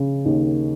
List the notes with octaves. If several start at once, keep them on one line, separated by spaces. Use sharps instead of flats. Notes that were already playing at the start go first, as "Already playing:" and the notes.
Already playing: C#3
D#2 D#3